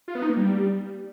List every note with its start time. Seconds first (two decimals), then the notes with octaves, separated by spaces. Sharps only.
0.08 F4
0.15 B3
0.22 D#4
0.30 A#3
0.37 G3